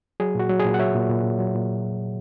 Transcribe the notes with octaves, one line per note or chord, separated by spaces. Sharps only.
F#3 G#4
A#2 F#4
F#3
G#4
A#2
F#5
F#3 C#5 E5
A#2
A#2
A#2
F#3
A#2